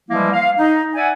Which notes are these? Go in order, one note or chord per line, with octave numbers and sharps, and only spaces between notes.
E3 F3 G3 G#3 A#3 E4
F5
D#4
D5 E5 F#5 G#5